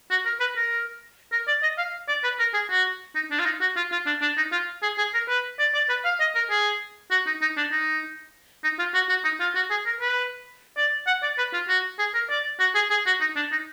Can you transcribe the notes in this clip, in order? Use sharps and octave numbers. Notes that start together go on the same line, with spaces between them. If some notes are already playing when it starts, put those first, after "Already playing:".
F#4
A#4
B4
A#4
A#4
D5
D#5
F5
D5
B4
A#4
G#4
F#4
D#4
D4
F4
D#4
F#4
F4
F4
D4
D4
D#4
F4
G#4
G#4
A#4
B4
D5
D5
B4
F5
D#5
A#4
G#4
F#4
D#4
D#4
D4
D#4
D#4
F4
F#4
F#4
D#4
F4
F#4
G#4
A#4
B4
D5
F#5
D5
B4
F4
F#4
G#4
A#4
D5
F#4
G#4
G#4
F#4
D#4
D4
D#4